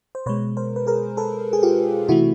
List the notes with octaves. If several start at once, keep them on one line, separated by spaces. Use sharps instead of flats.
C5
B2 G#3 B4 C#5
A#4 C5
B4
G#4 A#4
A4 B4
G#4
F4 G4
C3 E3 A3 E4 F#4